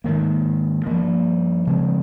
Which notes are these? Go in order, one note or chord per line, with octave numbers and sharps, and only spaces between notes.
G#2 D#3 A#3
G2 F3 A#3
C#3 F3 G#3 C4